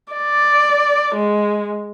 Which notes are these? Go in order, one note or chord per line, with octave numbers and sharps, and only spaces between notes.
D5
G#3